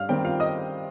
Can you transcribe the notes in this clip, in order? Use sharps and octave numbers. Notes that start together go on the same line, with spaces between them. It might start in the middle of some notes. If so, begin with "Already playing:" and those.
Already playing: G2 F5 F6
D#3 G3 C4 G4 G5
F4 F5
D#5 D#6